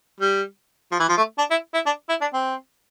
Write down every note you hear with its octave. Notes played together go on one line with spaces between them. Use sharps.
G3
F3
E3
F3
A3
D4
E4
E4
D4
E4
D4
C4